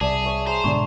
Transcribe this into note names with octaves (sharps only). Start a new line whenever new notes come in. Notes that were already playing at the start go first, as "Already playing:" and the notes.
C2 G#4 D5 E5 A5 E7
C#5 E5
G#4 C5 A#5 C6 F7
G#2 B2 D3 G#4 D5 C#6